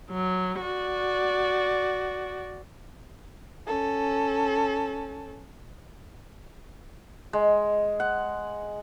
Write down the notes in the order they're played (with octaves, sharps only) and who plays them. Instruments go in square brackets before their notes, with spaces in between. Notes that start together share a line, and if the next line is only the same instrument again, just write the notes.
[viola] F#3
F#4 D5
[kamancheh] C#4 A4
[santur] G#3
F#5